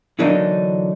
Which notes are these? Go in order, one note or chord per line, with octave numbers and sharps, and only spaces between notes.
D3 E3 F#3 A#3 D4 D#4